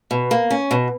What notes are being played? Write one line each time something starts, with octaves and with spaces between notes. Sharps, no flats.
B2
A#3
C#4
B2